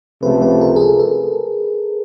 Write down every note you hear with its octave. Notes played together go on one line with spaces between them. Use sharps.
C#2 C3 F3 A3 B4
B4
A#4
G#4
A4
A4